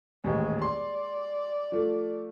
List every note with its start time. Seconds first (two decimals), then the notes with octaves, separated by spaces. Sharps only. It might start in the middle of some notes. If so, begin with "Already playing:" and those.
0.24 D#1 A1 D#2 G#3
0.62 D5 C6
1.72 F3 A3